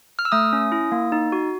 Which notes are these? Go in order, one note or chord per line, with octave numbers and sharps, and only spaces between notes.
F6
E6
A3 D#6
C#4
E4
A#3
D#4
F#4